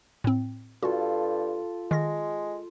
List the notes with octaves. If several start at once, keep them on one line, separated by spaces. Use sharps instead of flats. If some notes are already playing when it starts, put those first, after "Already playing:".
A2 C4
G2 F4 F#4 A4
D#3 G#3 A#6